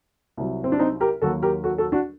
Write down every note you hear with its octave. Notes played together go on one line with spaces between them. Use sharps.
C2 C3 F#3
C4
D4
C4 D#4
G4 A#4
D#2 D#3 F#3 A#3 F#4 A4
G4 A#4
F#4 A4
F#4 A4
D4 F#4